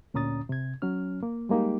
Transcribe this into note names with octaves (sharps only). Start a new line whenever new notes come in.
D2 A#2 C#4 A#5 D#6 A6
C3 G#6
F#3 C#4 F6
A#3
G3 G#3 A#3 D#4 G4